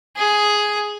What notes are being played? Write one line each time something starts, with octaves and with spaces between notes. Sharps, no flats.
G#4